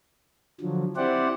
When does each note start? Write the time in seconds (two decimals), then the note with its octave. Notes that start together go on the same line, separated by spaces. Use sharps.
0.61 D3 F3 F#3
0.97 C4 E4 G4 C5 D5 F#5